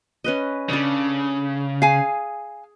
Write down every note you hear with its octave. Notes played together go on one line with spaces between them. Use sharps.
C#4 B4 D#5
C#3 D4 A4
G#4 F5 G#5